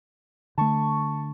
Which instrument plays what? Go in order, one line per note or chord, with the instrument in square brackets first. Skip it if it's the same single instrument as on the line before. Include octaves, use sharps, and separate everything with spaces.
[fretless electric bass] D3 A3 [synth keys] A5 C#6